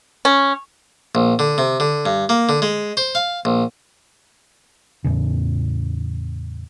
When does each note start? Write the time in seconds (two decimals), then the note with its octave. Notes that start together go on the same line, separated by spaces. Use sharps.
0.25 C#4
1.15 A#1
1.39 D3
1.58 C3
1.80 D3
2.06 G2
2.29 A#3
2.49 D3
2.62 G#3
2.97 C5
3.15 F5
3.45 A#1
5.04 E2 A2 C#3